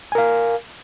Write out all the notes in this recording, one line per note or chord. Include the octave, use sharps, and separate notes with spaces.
A#4 F5 G#5